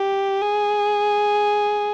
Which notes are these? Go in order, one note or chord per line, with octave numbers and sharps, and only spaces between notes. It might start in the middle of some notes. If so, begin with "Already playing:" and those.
Already playing: G4
G#4